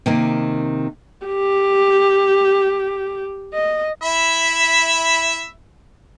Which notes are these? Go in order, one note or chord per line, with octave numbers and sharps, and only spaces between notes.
C3 D#3 A#3
G4
D#5
E4 E5 B5